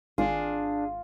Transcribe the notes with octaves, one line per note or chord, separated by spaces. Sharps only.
G#1 D4 F4 G#4